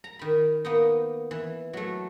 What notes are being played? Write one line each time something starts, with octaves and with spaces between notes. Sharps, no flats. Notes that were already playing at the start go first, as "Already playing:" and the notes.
A#5
D#3 B5
A#3 B3 D#4
E3
F#3 A3